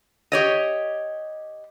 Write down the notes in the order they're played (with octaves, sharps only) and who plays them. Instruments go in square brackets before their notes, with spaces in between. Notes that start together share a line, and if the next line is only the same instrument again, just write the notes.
[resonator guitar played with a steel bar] G4 C#5 D#5